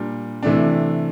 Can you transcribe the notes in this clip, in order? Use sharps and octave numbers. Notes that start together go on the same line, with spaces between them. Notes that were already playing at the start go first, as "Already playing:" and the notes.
Already playing: A#2 G3 D4
C3 E3 A3 D4